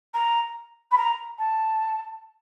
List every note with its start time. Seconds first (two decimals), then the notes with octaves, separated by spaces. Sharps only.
0.14 A#5
0.91 B5
0.97 A#5
1.38 A5